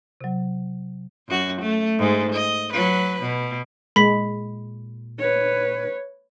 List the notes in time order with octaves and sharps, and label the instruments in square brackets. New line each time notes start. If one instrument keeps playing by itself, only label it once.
[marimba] C3 F#3
[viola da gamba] F#2 F#4
A3
G#2 G#3
D#5
F#3 B4
B2
[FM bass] A#2 [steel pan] G#3 [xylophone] B5 B6
[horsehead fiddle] B4 C#5